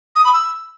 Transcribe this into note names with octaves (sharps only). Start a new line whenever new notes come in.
D#6
B5
E6